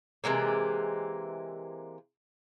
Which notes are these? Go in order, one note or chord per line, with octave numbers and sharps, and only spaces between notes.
C3 E3 G#3 A#3